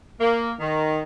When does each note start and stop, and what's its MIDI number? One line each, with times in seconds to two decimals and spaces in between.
0.20 0.52 58
0.60 1.01 51